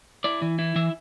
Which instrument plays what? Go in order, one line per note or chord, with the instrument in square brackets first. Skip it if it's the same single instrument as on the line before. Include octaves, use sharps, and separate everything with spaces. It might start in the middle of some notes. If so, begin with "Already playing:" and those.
[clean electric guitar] E4 D5
E3
E4
E3 E5